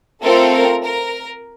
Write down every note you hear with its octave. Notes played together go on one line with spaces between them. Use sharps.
A3 C4 F4 A4 A#4
A#4
A#4